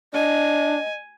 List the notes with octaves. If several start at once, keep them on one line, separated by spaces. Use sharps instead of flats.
D4 D#5 G#5